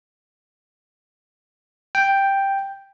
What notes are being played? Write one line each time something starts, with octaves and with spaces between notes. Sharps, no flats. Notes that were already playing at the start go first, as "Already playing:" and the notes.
G5